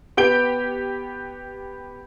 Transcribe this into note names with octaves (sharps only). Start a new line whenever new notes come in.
B3 G4 G6 D7 G7